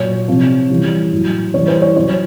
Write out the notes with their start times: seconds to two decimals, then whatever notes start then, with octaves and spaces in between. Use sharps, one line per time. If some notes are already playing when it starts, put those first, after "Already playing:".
Already playing: A#2 F#3 C#5
0.28 C3 F3
0.70 C#3 E3 G3
1.12 A2 F#3
1.54 C#3 E3 G3 C#5
1.68 C5
1.82 C#5
1.97 C#3 F#3 C#5